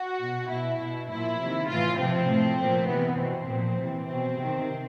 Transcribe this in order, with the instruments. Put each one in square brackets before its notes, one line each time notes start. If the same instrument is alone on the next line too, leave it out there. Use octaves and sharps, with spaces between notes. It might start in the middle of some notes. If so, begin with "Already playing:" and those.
Already playing: [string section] F#4
B2
B2 E4
B2
A#2 F3 E4
C3 D#3
A2 E3 F4
C3 F3 C4
A2 F3
A#2 F3
C3 E3 B3
B2 C4
A#2 F3
C3 E3
B2 C4
C3 D#3